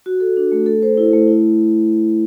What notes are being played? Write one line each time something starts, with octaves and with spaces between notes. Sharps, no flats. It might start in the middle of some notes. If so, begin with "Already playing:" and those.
F#4
A4
D4
A3
A4
C5
E4
A3
E4